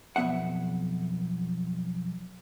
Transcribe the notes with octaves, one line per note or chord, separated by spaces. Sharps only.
B1 F2 B3 E5 F#5